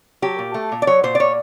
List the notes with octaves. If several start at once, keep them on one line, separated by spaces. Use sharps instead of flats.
F#3 G4
A#2
A3
A#2
D5
F#3 C#5
A#2 C5
D5
A#2 C#5